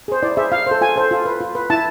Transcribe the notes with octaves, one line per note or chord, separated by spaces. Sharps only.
G#4 C5
E4 D5
G#4 C5 E5
F4 F5
A4 C5
F4 G#5
A4 C5
F4
B4
F4
B4
E4 A5